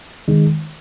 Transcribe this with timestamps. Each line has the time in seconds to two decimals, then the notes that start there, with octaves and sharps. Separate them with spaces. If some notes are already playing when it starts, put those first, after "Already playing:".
0.28 D#3 G#3